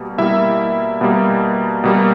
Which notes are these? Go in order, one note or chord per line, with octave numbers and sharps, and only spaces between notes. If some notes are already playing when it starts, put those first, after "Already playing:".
Already playing: B2 G3 A#3
B2 G3 A#3 E4 E5
B2 G3 A#3
B2 G3 A#3